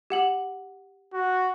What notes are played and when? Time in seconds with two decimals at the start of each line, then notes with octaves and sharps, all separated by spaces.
0.10 G4 F#5 F#7
1.14 F#4